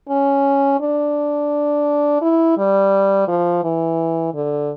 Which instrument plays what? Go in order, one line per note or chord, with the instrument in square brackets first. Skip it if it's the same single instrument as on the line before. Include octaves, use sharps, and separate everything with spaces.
[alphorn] C#4
D4
E4
G3
F3
E3
D3